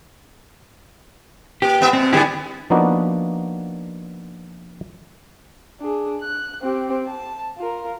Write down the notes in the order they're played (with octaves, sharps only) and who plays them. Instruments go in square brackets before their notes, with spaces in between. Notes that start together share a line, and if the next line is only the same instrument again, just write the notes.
[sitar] A#3 [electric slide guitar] G4
[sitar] G#2 B3 E5
[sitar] B2 [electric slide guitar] C4
[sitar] D3 G3 B3 [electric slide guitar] E4 G4 G#4
[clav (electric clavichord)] F3 A#3 B3 D4 D#4 F#4
[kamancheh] D4 G#4
F#6
C4 G4
A5
F4 A#4